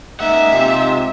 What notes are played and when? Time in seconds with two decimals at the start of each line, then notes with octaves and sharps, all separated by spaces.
0.20 G#3 A#3 D#4 E5 F#5
0.53 C3 D#4 F4 G4